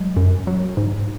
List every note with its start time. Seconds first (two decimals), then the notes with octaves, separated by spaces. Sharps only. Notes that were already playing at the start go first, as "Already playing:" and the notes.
Already playing: F#3 G#3
0.16 F#2
0.47 F#3
0.77 G#2